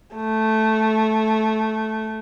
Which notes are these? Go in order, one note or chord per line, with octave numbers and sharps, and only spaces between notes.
A3